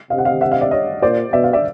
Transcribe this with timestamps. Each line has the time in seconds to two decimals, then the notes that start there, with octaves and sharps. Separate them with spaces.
0.10 C3 D#5 F5
0.18 F#5
0.25 D#5 F5
0.41 E5 F#5
0.51 D#5 F5
0.61 D5 E5
0.71 C#5 D#5
1.02 A#2 C5 D5
1.33 B2 D5 E5
1.44 F5
1.53 D5 E5